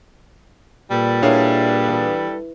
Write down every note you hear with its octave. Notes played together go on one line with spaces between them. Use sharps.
A#2 G3 A4 B4
D4 E4 G#4 A#4 C#5 F5
E3